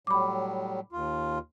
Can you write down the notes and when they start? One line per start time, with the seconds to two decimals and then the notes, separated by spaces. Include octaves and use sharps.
0.07 A2 F#3 G3 B5 D6
0.92 D#2 F4